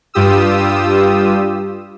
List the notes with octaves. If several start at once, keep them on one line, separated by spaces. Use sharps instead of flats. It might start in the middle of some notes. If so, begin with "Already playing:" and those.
G2 F4 G4 D#6 E6